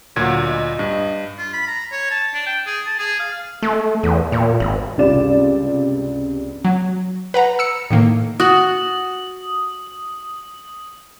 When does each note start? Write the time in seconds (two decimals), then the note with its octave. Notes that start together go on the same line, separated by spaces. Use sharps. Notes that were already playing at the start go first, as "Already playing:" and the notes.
0.16 D2 A#2 F#3 G#6
0.47 D#5
0.79 G2
1.38 F4
1.53 B5
1.67 A#5
1.92 C#5
2.11 A5
2.34 D4
2.46 G5
2.66 G#4
2.86 A5
2.99 G#4
3.19 F5
3.63 A3
4.03 E2
4.32 A#2
4.60 G#1
4.97 C#2 G2 C3 F4 D5 E7
6.65 F#3
7.34 B4 F#5 A#5
7.59 E6 C#7
7.90 A2 D#3 A#3
8.40 F#4 D#6 F#7